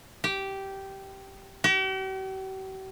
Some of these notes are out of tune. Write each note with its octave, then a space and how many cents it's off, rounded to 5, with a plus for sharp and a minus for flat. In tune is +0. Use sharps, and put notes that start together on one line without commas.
G4 -10
G4 -45